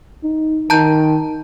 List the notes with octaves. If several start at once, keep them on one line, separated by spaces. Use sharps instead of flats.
D#4
D#3 A5 A#5 G6